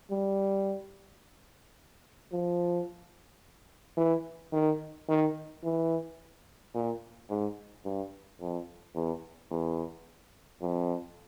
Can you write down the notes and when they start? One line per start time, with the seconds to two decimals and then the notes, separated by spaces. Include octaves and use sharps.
0.11 G3
2.32 F3
3.97 E3
4.53 D#3
5.09 D#3
5.64 E3
6.74 A#2
7.30 G#2
7.85 G2
8.41 F2
8.95 E2
9.51 E2
10.62 F2